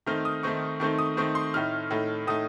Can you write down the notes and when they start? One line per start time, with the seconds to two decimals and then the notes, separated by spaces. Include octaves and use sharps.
0.06 D#3 A3 C4 D#4 F6
0.25 D#6
0.43 D#3 A3 C4 D#4 C#6
0.80 D#3 A3 C4 D#4 C#6
0.99 D#6
1.17 D#3 A3 C4 D#4 C#6
1.35 C6
1.54 A2 A3 D#4 F6
1.90 A2 A3 D#4
2.27 A2 A3 D#4 D#6